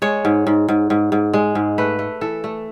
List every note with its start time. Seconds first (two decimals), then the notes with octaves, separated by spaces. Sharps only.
0.02 G#3 C#5
0.25 G#2
0.47 G#2
0.68 G#2
0.90 G#2
1.12 G#2
1.34 G#3
1.55 G#2
1.78 A3 B4
1.99 A3
2.21 E3 A4
2.44 A3